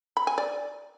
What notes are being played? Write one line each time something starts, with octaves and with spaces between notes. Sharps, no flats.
B5
G#5
D5